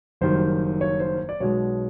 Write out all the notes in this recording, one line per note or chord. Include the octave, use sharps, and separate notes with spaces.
F#1 F#2 D#3 G3 C5
C#5
C5
D5
B1 B2 G#3 C#5